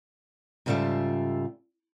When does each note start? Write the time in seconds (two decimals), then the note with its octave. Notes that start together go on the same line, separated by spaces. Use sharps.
0.66 G#2 C#3 G3 F4 A4 E5